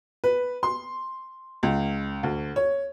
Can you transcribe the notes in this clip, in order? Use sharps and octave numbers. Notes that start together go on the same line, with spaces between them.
B4
C6
C#2
D2
C#5